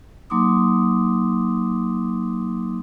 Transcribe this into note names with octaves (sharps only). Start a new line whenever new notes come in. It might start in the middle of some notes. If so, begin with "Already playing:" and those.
F#3 A#3 D#4 C6 D6 D#6